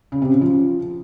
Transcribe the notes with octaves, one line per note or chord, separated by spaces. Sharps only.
C#3
C3
C#3
F3